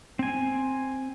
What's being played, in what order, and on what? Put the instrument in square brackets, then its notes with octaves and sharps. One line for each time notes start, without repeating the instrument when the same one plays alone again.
[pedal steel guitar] C4 G#5